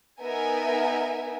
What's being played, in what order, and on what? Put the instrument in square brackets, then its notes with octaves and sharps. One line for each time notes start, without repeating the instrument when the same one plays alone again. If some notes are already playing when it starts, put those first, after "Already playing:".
[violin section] B3 D#4 A#4 E5 G#5